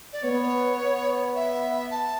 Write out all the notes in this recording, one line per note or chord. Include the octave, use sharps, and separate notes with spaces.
D5
B3 C#5
B3
E5
A5